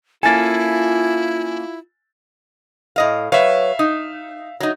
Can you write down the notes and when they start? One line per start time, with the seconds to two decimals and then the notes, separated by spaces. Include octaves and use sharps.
0.23 A#3 C#4 E4 F4 A4 G#5 A6
2.96 A2 D#5 F5
3.32 F#3 B4 C#5 E5 F5
3.79 D#4
4.60 F#3 D#4